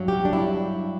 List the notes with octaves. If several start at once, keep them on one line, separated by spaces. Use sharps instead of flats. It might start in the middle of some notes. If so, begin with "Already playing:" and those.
Already playing: G2 F#3
G4
D4
E4